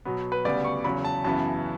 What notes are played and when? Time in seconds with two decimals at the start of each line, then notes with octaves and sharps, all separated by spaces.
0.05 B2 F#3 B3
0.32 B4
0.44 D2 C#3 G3 B3 D5
0.64 C#6
0.84 E2 C#3 F#3 B5
1.05 A5
1.24 F#2 C#3 E3 B3 A5